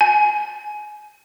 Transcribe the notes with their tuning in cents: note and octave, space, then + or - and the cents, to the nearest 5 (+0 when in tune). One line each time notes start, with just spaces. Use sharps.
G#5 +20